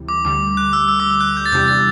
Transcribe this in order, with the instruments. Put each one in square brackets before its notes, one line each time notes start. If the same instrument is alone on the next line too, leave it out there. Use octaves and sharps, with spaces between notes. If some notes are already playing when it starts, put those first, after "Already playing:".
Already playing: [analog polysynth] D2 C3 E3 G3
[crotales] D6
[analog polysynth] D2 D3 G3 [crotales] D6
[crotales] F#6
E6
E6
D6
E6
F#6
G6
A6
[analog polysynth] E2 C3 G3 D4 G4 [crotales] G6
[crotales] A6